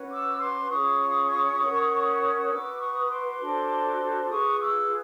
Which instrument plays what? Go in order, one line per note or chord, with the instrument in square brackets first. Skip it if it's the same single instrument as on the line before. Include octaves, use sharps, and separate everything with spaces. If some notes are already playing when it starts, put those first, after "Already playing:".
Already playing: [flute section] C#4 F#4 B4
D6 E6
C6 D6
C#4 F4 G#4 C#6 D#6
C#4 F#4 A#4 C#5
F#4 B4 D6 E6
C#6 D#6
C6 D6
D4 F#4 A4 C5
F4 G#4 B4 C#6 D#6
D6 E6